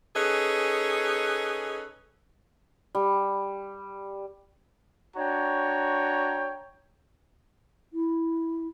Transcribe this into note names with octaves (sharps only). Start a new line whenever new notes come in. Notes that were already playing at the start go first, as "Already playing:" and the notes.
C#4 D#4 G#4 A4 B4
G3
D4 F#4 C#5 G5 A#5
E4